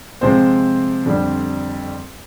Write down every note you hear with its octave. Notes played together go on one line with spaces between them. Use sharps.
C3 F3 G#3 C4 C5
F2 D3 G3